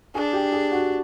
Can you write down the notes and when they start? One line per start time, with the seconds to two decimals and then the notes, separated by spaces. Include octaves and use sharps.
0.15 D4 G#4
0.33 G4
0.52 G#4
0.72 F#4